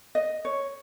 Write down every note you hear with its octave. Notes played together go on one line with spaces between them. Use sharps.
D#5
C#5